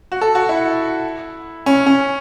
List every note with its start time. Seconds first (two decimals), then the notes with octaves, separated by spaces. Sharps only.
0.12 F#4
0.21 A4
0.35 F#4
0.49 E4
1.66 C#4
1.86 C#4